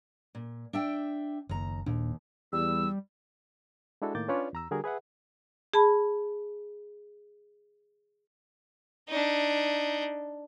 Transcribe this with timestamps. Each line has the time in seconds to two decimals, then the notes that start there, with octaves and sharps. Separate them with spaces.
0.35 A#2
0.73 D4 E5 G5
1.49 F#1 D#2 A#5
1.86 D#1 D#2 A#2 D4
2.53 E2 G3 E6
4.02 G#3 D4 E4 F#4 A4
4.15 A2 D#3 A#3 D6 G6 A6
4.28 C#4 D4 F4 B4 C#5 D5
4.53 E2 A#5 E6
4.71 D3 G3 F#4 G#4 A#4
4.84 G#4 B4 E5 F#5
5.74 G#4 A5 B5
9.09 D4 D#4